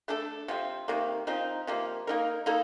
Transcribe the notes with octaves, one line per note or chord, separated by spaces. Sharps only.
A3 D4 A4
C3 F3 C4
C3 D#3 A#3
F3 C4 D#4
C3 F3 A#3
A#3 D#4 A#4
A#3 D#4 A4